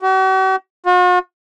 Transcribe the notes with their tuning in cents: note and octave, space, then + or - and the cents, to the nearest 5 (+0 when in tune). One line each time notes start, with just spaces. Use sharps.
F#4 +45
F#4 -45